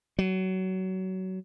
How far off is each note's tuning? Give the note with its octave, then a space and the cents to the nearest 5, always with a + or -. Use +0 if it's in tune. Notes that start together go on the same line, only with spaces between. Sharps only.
F#3 +25